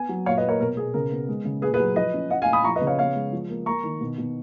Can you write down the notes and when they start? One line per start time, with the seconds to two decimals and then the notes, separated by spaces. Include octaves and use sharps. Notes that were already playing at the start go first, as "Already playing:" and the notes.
Already playing: B3 G#5
0.09 F#3
0.26 A#2 C#5 F5
0.37 B4 D#5
0.43 A#2
0.49 A#4 C#5
0.60 B2 A#4
0.77 B2 G#4
0.94 C#3 A#4
1.11 B3
1.28 G#3
1.45 C#3
1.62 A#2 G#4 B4
1.74 G#4 B4
1.80 F#3
1.96 F3 B4 D#5
2.14 C#4
2.30 C#4 D#5 F#5
2.42 F5 G#5
2.47 A#2
2.53 B5 D#6
2.64 F3 A#5 C#6
2.76 B4 D#5
2.81 C#3
2.87 C#5 F5
2.98 B3 C#5 F5
3.15 G#3
3.33 F3
3.49 A#3
3.66 A#3 A#5 C#6
3.84 D#3
4.01 B2
4.18 B2